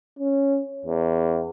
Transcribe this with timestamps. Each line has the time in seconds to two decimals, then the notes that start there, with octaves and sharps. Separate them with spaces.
0.19 C#4
0.86 E2